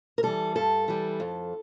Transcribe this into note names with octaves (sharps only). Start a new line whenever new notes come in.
A#4
E3 G3 A4
G2 A4
E3 G3
F2